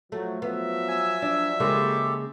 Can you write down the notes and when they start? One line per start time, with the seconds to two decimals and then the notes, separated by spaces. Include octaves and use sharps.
0.12 F3 F#3 A3
0.42 F3 F#3 B3 E5
0.88 G#5 E6
1.22 D4
1.60 C#3 G#3 A#3 G4 A4